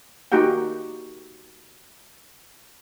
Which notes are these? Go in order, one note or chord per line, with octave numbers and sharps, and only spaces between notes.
A#3 D#4 F#4 G4 F#5 G5